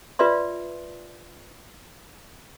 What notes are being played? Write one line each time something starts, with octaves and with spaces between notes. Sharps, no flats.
F4 B4 D5 E5 C6